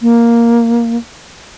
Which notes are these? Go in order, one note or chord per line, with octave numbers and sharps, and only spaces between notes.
A#3